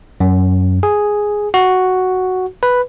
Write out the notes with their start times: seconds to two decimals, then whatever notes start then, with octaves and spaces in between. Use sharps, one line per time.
0.20 F#2
0.83 G#4
1.54 F#4
2.63 B4